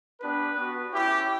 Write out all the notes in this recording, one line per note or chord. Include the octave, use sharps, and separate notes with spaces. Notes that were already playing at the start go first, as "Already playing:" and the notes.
B3 D4 G4 B4
B3 F#4
C#4 E4 G4